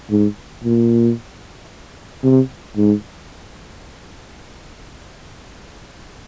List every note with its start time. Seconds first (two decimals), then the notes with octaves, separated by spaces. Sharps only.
0.10 G#2
0.64 A#2
2.24 C3
2.77 G#2